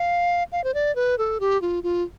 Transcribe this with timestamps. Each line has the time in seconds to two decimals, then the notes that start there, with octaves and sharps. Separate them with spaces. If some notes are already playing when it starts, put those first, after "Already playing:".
Already playing: F5
0.52 F5
0.64 C5
0.74 D5
0.96 B4
1.18 A4
1.40 G4
1.62 F4
1.83 F4